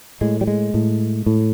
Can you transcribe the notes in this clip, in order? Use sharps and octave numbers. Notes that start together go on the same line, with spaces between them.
A2 G#3
G3
G#3
A2
A2